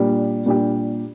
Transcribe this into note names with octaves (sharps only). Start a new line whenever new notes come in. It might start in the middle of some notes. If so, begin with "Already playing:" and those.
Already playing: A#2 G3 D4 G4
A#2 G3 D4 G4